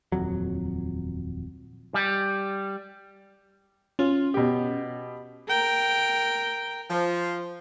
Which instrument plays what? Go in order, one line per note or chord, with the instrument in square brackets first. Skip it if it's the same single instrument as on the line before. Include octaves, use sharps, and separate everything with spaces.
[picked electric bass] D#1 F2 F#3
[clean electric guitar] G3
[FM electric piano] C#4 [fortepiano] F4
[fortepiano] B2 G4
[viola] A#4 G5
[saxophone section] F3